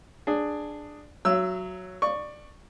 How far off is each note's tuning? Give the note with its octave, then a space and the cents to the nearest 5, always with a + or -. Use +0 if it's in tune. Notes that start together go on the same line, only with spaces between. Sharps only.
D4 +10 G#4 +0
F#3 +0 E5 +45 E6 +0
D5 +20 C#6 +0